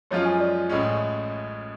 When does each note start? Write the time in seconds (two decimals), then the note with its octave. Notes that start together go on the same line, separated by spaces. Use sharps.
0.11 F#2 F3 G#3 C#4 F4 C#5
0.25 G#5
0.40 D5
0.69 A1 A2 G#3 C#4